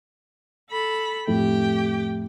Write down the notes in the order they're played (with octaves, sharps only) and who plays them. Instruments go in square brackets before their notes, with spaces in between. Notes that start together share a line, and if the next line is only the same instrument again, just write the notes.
[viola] A4 B5
[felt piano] F2 A2 A3 [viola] G4 G5